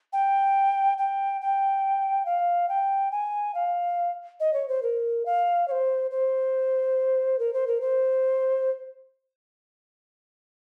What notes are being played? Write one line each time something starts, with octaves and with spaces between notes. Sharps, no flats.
G5
G5
G5
F5
G5
G#5
F5
D#5
C#5
C5
A#4
F5
C#5
C5
C5
A#4
C5
A#4
C5